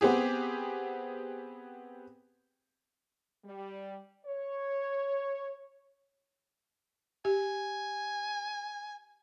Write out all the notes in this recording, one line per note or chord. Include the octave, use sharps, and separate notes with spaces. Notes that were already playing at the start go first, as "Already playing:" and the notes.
B3 C4 G4 G#4
G3
C#5
G4 G#5